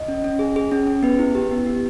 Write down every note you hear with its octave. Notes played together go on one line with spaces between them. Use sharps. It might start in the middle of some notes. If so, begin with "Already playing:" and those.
Already playing: D#5
C#4
C#4
G#4
G#4
C#4
C#4
B3 B4
E4
G4
B3
B3